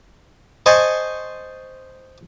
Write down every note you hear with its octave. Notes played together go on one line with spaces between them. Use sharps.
C5 D#5 G#5 A5 C#6